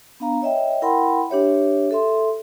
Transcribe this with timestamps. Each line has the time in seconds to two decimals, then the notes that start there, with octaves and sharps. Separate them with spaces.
0.20 B3 D4 F5 A#5
0.42 C#5 D#5 E5 G5
0.82 E4 A#4 F#5 G5 B5 C6
1.30 D4 G4 C#5 E5
1.91 A4 E5 C6